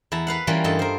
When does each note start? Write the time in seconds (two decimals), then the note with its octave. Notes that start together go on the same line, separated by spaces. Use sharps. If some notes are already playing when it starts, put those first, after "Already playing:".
0.12 E2 E4 A5 A#5
0.27 B4 F5 F#5
0.47 E3 G3 A#3 C#4 F4
0.64 G2 A4 D#5 A5
0.79 A#4 C5